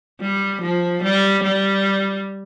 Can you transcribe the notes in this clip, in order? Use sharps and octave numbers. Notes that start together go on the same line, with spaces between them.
G3
F3
G3
G3